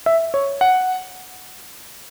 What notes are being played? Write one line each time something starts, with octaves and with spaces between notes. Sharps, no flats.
E5
C#5
F#5